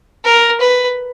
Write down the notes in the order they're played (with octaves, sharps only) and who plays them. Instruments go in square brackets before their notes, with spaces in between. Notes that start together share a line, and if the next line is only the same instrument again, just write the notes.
[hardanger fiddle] A#4
B4